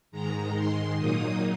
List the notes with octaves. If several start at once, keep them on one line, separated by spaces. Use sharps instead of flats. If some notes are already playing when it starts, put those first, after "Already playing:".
G#2 D#3 G#3 A#5
C6
A#2 F#3 A#3 D#4 D#6